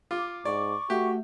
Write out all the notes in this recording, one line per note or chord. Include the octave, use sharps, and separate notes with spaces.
F4 D6
G#2 D5 C#6
A3 F#4 G4